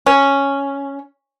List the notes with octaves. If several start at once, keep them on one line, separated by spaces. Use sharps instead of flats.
C#4